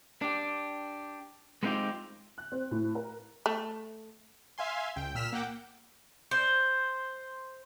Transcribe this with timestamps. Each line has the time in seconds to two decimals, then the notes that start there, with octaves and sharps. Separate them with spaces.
0.22 D4 G4
1.63 G#3 B3 C4 D#4 F4 G4
2.38 F#6
2.52 C4
2.71 A2
2.95 A#4
3.46 A3
4.58 E5 F5 G#5 C6
4.96 C#2 G5
5.15 A#2 E6 F6 B6 E7
5.33 A#3 F#5 G5 D6
6.31 C5